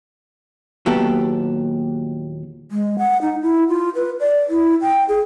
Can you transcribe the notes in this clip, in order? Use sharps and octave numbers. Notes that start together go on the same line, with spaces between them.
D#2 A#2 F#3 B3 G4 A4
G#3
F#5
D#4
E4
F4
B4
D5
E4
G5
G#4